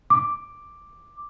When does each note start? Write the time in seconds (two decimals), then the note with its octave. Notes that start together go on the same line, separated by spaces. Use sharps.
0.10 D6